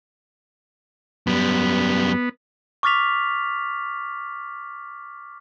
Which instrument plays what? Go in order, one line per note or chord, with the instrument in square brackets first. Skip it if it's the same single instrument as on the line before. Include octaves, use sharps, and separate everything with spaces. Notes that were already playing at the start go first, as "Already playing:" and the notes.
[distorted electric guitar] F#2 G3 [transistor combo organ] B3
[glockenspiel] C#6 D6 F6 A6 B6 F7